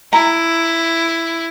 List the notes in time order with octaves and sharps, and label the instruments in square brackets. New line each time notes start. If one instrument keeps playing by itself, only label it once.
[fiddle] E4 [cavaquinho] A#5